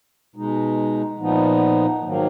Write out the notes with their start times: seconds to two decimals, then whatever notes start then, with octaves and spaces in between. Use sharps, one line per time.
0.35 B2 G#3 D#4
1.19 A#2 F3 B3 D#4
2.03 G#2 D#3 F#3 A#3